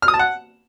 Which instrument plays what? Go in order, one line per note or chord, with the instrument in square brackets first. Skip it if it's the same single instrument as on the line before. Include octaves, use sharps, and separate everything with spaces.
[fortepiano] F6
D#6
A5
F#5